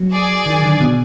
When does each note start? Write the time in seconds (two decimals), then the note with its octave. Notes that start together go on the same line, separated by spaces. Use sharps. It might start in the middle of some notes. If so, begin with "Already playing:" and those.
Already playing: F#3
0.11 G#4 D5 G#5
0.46 D#3
0.63 D3
0.81 B2